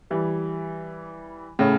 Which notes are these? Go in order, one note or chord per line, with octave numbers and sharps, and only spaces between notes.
E3 G3
A2 C#3